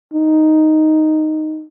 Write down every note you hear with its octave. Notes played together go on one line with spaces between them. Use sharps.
D#4